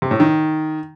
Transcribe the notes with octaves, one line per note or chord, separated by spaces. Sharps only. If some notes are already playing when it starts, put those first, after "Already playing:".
C3
A2
D#3